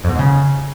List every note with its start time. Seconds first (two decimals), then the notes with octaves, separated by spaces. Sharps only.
0.04 F2
0.09 B2
0.14 G#2
0.19 C#3